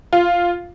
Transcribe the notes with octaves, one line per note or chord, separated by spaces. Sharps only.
F4